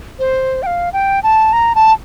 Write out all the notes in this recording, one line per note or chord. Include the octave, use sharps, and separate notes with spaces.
C5
G5
F5
G5
A5
A#5
A5